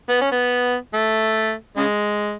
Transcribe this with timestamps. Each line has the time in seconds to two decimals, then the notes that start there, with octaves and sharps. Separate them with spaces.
0.10 B3
0.21 C#4
0.32 B3
0.93 A3
1.77 C#3 G#3